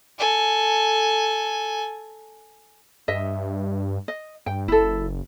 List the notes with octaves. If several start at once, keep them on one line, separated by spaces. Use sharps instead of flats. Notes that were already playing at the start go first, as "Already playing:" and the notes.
A4 G#5
G2 D#5 E5
D#5
G2 G5
F#1 E4 A4